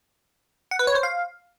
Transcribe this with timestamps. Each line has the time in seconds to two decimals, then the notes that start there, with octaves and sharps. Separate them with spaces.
0.71 F#5
0.79 B4
0.87 C#5
0.95 C5
1.03 F5